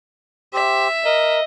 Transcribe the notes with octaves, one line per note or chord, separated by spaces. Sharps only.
G4 C5 E5
A#4 D#5